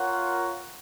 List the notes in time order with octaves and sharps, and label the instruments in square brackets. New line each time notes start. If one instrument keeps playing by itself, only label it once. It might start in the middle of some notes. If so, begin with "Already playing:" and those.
Already playing: [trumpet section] F4 A#4 C#5 F#5